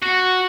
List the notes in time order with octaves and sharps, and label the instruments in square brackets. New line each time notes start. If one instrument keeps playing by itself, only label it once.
[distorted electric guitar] F#4